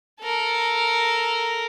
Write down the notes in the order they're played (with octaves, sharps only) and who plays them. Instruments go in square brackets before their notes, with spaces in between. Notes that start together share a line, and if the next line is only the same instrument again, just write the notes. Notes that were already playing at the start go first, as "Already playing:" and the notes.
[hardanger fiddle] A4 A#4